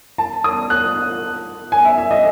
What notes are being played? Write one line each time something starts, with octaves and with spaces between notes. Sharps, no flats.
A5
D#6
F#6
G#5
E5
E5
D#5